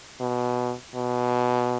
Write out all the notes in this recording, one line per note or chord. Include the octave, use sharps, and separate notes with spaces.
B2
B2